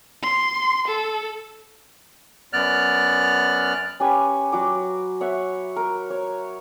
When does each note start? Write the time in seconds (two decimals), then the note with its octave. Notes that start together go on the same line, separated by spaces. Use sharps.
0.22 C6
0.88 A4
2.53 F#2 B3 D5 F6 F#6
4.00 C#4 G4 B4 G#5
4.52 F#3 F#4 D6
5.21 C#5 E5 F#5
5.76 A#4
6.10 C#5